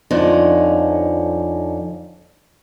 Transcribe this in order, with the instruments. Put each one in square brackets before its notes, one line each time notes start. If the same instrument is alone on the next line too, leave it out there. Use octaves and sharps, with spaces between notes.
[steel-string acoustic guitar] F2 D3 F3 C#4 D#4